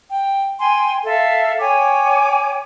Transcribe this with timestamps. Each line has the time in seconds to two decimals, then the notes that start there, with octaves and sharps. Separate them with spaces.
0.11 G5
0.60 G5 G#5 C6
1.05 A4 E5 F5
1.59 C#5 G5 G#5 D6